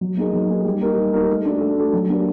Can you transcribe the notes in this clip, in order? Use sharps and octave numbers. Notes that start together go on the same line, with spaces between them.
F#3
A#3 D#4 G#4
F#3
A#3 D#4 G#4
G3
A#3 D#4 G4 A#4
G3
A#3 D#4 G4 A#4
A3
D4 F#4 A4
A3
D4 F#4 A4
F#3
A#3 D4 G4